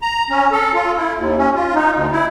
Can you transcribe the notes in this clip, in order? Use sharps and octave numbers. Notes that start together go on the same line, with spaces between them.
A#5
C#4
A4
F4
E4
D#2
C#4
F4
D#4
D2
E4